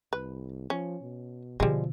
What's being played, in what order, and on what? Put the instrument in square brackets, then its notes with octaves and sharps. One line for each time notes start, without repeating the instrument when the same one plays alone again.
[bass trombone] C2 [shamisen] B4
[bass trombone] F3 [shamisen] C#4
[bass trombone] B2
[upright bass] B2 D3 [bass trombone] F3 [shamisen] G3 G#3